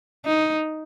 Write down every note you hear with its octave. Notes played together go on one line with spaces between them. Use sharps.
D#4